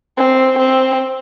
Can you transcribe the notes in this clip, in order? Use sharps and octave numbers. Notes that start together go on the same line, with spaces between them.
C4
C4